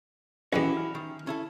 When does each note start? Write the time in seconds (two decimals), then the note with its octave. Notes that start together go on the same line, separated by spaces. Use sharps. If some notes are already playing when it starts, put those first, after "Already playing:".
0.53 B1 E2 C#4 E4 F#4 G4
0.77 F6
0.95 D#3
1.27 C#4 E4 A4